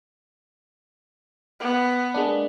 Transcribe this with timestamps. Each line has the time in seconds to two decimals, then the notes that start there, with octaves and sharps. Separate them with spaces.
1.61 B3
2.14 G#3 A#3 D4